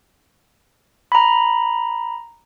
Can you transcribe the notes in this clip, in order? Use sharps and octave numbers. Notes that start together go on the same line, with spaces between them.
A#5 B5